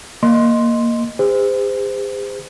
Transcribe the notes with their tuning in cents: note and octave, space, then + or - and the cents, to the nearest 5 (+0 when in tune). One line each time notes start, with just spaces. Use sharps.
A#3 +0 D#5 +0 C6 +0
G#4 -45 C5 -30